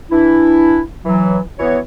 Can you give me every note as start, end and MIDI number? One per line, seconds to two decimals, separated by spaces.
0.11 0.80 52
0.11 0.80 62
0.11 0.80 64
1.05 1.39 52
1.05 1.39 54
1.59 1.78 52
1.59 1.78 59
1.59 1.78 66
1.59 1.78 73